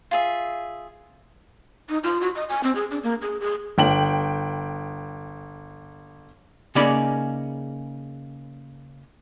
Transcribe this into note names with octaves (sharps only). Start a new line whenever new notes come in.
F4 G#4 E5
D#4
F4
F#4
D#5
G#5
C4
G#4
D4
A#3
G#4
G#4
G1 G5 F#7
C#3 A#3 C#4 D#4 D5 B5